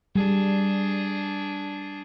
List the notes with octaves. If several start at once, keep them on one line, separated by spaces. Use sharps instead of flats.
G3 D4 G#4